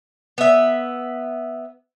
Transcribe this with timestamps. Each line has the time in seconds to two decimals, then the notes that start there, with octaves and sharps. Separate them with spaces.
0.38 B3 E5